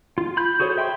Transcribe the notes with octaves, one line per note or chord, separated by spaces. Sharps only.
F4
B5 G6
F#4 G#4 A4 C5 C#5
E5 G5 B5 C6